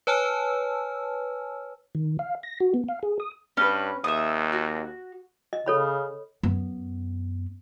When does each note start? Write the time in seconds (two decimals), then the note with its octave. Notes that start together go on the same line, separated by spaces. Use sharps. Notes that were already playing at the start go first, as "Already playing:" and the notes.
0.07 B4 C#5 G#5 A5 E6 F6
1.95 D#3
2.19 F5
2.43 A#6
2.60 F#4
2.74 B3
2.89 F5
3.03 G#4
3.20 D#6
3.57 G2 C#4 B4
4.04 D#2 E5 D#6
4.52 F#4
5.53 D#5
5.66 C#3 A4 C#5 B5
6.43 F#2 B3